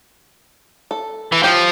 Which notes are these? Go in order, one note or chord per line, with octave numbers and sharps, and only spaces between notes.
A4
E3
F3 G4